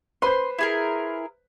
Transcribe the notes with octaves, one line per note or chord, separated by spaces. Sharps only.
B4 C5 C6
E4 G#4 A#4